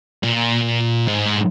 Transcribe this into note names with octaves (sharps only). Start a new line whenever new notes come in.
A#2
G#2